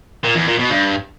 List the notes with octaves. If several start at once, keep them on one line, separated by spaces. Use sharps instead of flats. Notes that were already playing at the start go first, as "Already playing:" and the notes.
A#2
E2
A#2
B2
G2